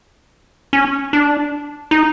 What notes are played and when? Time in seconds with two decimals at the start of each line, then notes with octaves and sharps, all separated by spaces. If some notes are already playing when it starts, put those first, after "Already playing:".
0.73 C#4
1.13 D4
1.91 D#4